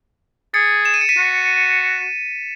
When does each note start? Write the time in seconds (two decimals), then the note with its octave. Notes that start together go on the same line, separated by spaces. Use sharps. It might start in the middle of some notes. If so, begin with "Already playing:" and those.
0.54 G#4 A6 C#7
0.85 E7
0.94 D#7
1.01 C#7
1.09 B6 D#7
1.17 F#4